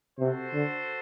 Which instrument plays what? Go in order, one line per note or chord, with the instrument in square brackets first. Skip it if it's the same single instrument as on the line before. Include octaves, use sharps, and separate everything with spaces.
[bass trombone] C3 [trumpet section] F#4 A4 C5
[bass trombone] D3